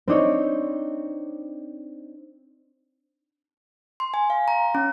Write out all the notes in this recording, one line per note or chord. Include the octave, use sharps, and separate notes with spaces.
C4 D4 D#4 C#5
C6
G#5
F5
A#5
C#4